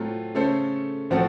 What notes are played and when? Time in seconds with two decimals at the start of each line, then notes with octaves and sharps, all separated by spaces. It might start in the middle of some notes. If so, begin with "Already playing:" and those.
Already playing: A2 F#3 A3 C4 F4
0.34 C#3 A3 C#4 A4 C5
1.10 A2 F3 C4 F#4 A4